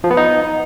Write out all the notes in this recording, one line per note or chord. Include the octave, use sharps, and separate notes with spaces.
F3
B3
D#4